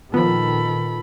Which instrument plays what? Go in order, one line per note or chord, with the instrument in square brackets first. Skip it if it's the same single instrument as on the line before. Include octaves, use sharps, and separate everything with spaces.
[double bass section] A#2 D#3 [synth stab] F3 B3 [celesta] F4 B4 [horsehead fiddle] A4 B5